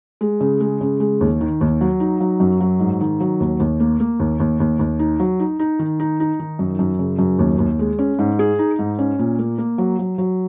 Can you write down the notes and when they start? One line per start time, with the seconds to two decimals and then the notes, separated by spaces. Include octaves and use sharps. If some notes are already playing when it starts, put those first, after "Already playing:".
0.21 G#3
0.41 C#3
0.61 G#3
0.81 C#3
1.00 G#3
1.21 D#2
1.41 D#3
1.61 D#2
1.81 F#3
2.00 D#4
2.20 F#3
2.40 F#2
2.60 F#3
2.80 G#2
3.01 D#3
3.20 F#3
3.40 D#2
3.60 D#2
3.80 A#3
4.00 A#3
4.20 D#2
4.40 D#2
4.60 D#2
4.79 D#2
4.99 D#4
5.20 F#3
5.40 D#4
5.59 D#4
5.79 D#3
6.00 D#4
6.20 D#4
6.40 D#3
6.59 F#2
6.79 F#2
6.99 C#3
7.19 F#2
7.39 D#2
7.59 D#2
7.79 G#3
7.99 C#4
8.19 G#2
8.39 G#4
8.59 D#4
8.79 G#2
8.99 C#4
9.19 A#2
9.39 A#3
9.58 A#3
9.78 F#3
9.99 F#3
10.18 F#3